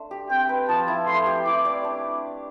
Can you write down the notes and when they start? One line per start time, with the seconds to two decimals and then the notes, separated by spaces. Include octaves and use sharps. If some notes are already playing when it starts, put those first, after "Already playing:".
Already playing: A3 D4 C5
0.11 G4
0.30 C4 G5
0.49 B4
0.69 F3 A5
0.88 E4
1.07 A3 C6
1.26 G4
1.46 E4 D6
1.65 D5
1.84 D4